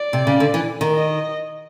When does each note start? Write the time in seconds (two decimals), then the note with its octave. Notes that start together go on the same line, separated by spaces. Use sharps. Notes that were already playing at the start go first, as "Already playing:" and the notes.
Already playing: D5
0.13 C3
0.27 C#3
0.40 D3
0.54 E3
0.81 D#3
0.94 D#5